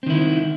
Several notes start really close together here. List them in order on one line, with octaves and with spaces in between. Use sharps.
C4 D#3 E4